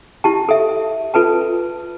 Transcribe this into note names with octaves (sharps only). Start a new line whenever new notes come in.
E4 G4 A5
A4 E5
F4 A4 B4 A5